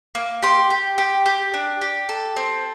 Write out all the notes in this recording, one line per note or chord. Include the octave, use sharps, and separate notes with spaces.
A#3
G4 C6
G4
G4
G4
D4
G4
A4
C4